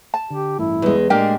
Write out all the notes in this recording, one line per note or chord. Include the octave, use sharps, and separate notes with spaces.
A5
D3 G4
A1 G2 A3 E4
E2 G#3
A2 G#3 A#3 D4 G4 A#4 G5